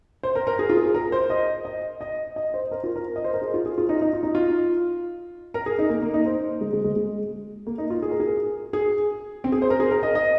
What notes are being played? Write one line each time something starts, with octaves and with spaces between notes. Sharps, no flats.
C5
A#4
A#4
G#4
F4
G#4
A#4
C5
D#5
D#5
D#5
D#5
C5
A#4
F4
A#4
D#5
C5
A#4
G#4
F4
G#4
F4
D#4
D#4
F4
D#4
F4
A#4
G#4
D#4
A#3
A#3
D#4
C5
G#3
G#3
G#3
G#3
A#3
D#4
F4
G#4
A#4
G#4
G#4
C4
G#4
C5
A#4
G#4
A#4
D#5
D#5